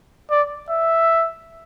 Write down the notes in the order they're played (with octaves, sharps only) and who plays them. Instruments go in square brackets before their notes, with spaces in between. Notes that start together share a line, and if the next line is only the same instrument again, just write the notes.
[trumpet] D5
E5